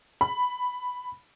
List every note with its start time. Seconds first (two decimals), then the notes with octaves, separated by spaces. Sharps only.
0.21 B5